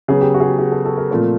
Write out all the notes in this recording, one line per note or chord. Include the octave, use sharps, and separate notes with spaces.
C#3 F#3 B3 G#4
G4
F#4
G#4
G4
G#4
A4
A4
A#4
A#2 F3 A3 C4